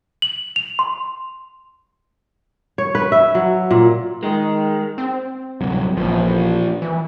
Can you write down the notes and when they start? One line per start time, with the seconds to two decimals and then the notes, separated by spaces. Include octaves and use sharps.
0.22 F#7
0.56 F7
0.79 C6
2.78 C#5
2.95 B4
3.12 E5
3.35 F#3
3.71 A#2
4.23 D#3 G#3
4.98 C4
5.61 D1 C2 F#3
5.97 A1 A#2 F3
6.82 E3